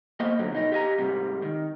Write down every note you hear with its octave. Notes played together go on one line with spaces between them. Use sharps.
A#3 B3 C5 D#5
F#2 D3 F#3
B2 D#4 D#5
G4 D#5 E5 G#5 A#5
G#2 C3 G3
D#3